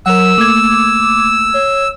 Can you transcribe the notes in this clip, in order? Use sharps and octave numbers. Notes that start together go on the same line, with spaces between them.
F#3 A#4 F#5 E6
A3 A#3 D6 G#6
C#5